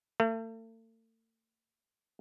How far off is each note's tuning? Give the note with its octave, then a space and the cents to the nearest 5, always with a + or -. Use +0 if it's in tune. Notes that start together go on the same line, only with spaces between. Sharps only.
A3 +40